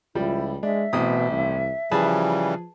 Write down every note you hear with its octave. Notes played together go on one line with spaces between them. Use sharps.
C#2 F3 G3 E4
G#3 D4 E5
A1 B2 C4 D#6
C2
C#3 E3 F3 G3 G#4 B4 A5